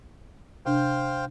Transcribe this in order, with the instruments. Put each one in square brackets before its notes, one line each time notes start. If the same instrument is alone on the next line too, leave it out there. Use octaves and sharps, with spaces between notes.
[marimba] C3 D4 [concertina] C5 F5 G5